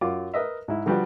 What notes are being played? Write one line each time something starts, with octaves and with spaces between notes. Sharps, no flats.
F#2 F4 D6
A#4 B4 D#5 E5
G#2 E4
D3 F3 G3 F#4 B4 G5